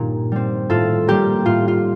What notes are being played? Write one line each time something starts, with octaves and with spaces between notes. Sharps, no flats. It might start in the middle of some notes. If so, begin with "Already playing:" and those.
Already playing: G2 A#2 D#3 A#3 G4
G3 C4
A2 F4 A4
G3 A#3 G4
A2 F4
F4